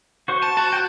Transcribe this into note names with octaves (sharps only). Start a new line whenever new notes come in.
F#4 C5 C#6
A5
F#4 A5
G5 F#6